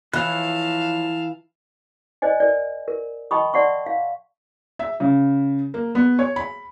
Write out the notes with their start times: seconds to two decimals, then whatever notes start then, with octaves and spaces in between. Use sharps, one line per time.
0.13 E3 F3 C#5 F5 A5 F#6
2.22 C5 D5 D#5 G#5
2.40 A#4 D5
2.88 A#4
3.31 D#5 G5 A5 B5 C#6 D#6
3.54 D5 E5 F#5 A5 C6 C#6
3.86 F5
4.79 E5
5.00 C#3
5.74 A#3
5.95 B3
6.19 C#5
6.36 B5